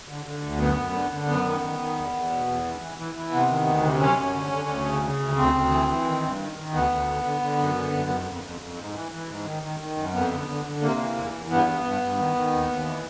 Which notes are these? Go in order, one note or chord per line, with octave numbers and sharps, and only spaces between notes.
D3
D3
D2
F#2 B3
F#2
D3
D3
F#2 B3
D#3
D#3
D#3
E2
E2
B2
E2
E3
E3
E3
E3
C3 B3
D#3
D2
C3
F#2 C#4
F#2
D3
D3
D2
C#3
C#3
D2
D2 C4
D2
E3
E3
D#3
G2
D#3
D#3
D2 B3
D2
D3
D3
D3
F#2
D3
F#2
F2
F2
F2
F2
G#2
E3
E3
G#2
D#3
D#3
D#3
F#2
F2 B3
D3
D3
D3
C3 A#3
E3
E2
E2
G2 B3
G2
G2
G2
D#3
D#3
D#2
D#2
E3